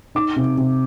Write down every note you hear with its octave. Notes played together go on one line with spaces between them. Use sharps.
D#4 D6
C3
C3